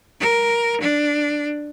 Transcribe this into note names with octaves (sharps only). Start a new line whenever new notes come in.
A#4
D4